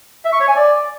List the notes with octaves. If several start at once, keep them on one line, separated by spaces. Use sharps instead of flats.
E5
C#6
C#5
G#5
D5